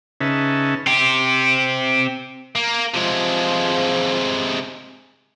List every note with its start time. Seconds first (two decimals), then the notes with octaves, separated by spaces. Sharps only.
0.21 C#3 C#4 D#4 B4 E5 A5
0.87 C4 G4
2.55 A#3
2.94 C3 F3 G#3